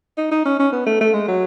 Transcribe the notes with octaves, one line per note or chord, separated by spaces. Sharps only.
D#4
D#4
C#4
C#4
B3
A3
A3
G#3
F#3